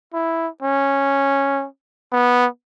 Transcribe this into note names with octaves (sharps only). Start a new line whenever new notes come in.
E4
C#4
B3